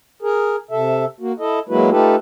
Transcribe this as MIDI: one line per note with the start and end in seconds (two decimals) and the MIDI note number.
0.22 0.56 68
0.22 0.56 70
0.71 1.05 48
0.71 1.05 69
0.71 1.05 76
1.20 1.32 58
1.20 1.32 66
1.39 1.59 64
1.39 1.59 69
1.39 1.59 75
1.69 1.90 54
1.69 1.90 56
1.69 1.90 58
1.69 1.90 64
1.69 1.90 66
1.69 1.90 71
1.90 2.16 57
1.90 2.16 63
1.90 2.16 65
1.90 2.16 67
1.90 2.16 69
1.90 2.16 71